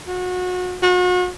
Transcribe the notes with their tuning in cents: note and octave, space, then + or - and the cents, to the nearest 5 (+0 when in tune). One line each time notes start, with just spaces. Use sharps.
F#4 -30
F#4 -40